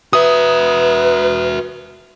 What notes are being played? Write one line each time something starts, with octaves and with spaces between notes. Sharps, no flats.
F#4 B4 E5 D#6